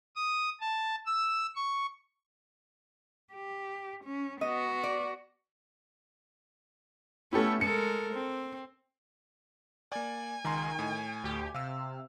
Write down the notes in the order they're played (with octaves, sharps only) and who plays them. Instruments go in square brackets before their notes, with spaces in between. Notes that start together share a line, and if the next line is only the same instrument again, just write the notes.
[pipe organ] D#6
A5
E6
C#6
[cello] G4
C#4
[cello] B3 F#4 [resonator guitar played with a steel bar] D#5
[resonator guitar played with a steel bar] D5
[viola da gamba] A3 B3 C#4 [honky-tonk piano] E4 G4 A4
[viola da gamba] G#3 A4 A#4 [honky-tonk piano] C#7
[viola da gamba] C4
[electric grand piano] A#3 D5 [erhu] G#5
[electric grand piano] C#2 A#5 C6 [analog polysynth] D#3
[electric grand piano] A2
[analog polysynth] D2 G4
[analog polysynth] C3 [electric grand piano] F5 E6